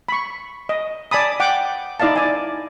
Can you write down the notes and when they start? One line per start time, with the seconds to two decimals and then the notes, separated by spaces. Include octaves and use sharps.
0.09 B5 C#6
0.69 D#5
1.11 D5 G#5 A5 B5 D#6
1.40 F#5 G5 D6
2.00 D#4 E4 D5 D#5 F5 A5
2.16 D5 G#5